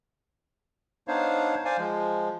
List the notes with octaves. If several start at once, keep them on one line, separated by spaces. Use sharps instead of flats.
B3 D4 D#4 C5 C#5 F5
C5 D5 F5 G#5
F3 G#3